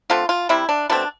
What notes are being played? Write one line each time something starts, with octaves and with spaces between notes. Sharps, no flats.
D3 A3 C4 F4
F4
C3 G3 C4 E4
D4
B2 A3 C4 D4